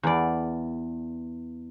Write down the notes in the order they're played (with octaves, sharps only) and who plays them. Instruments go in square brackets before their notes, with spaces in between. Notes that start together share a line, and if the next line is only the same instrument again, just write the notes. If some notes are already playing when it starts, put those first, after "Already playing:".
[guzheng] E2 D5